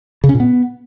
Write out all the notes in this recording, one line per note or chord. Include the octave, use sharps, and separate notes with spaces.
C#3
C#4
A#2
B3